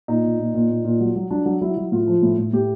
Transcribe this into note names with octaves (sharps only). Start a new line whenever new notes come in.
A#2 D#4
A#2
A#2
A#2
A#2
A#2
F#3
F#3
F#3 D4
F#3
F#3 E4
F#3
A2 F4
F3
A2
A2
A2 G4